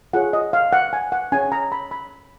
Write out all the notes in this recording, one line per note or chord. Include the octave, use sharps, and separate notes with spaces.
F4 G#4 C#5 F#5
D#5
F5
F#5
G#5
F#5
C#4 G#4 C#5 G#5
A#5
B5
B5